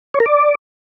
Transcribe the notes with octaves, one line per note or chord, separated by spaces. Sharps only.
C#5
A#4
D5